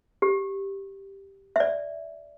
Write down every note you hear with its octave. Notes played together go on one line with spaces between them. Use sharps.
G4
E5
D5